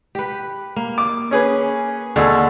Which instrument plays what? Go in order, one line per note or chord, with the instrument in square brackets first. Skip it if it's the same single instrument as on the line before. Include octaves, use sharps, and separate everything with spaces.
[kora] G4 B4
A#3
[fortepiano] D6
C#4 G#4 B4
[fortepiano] D#2 G#4 A4 [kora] D3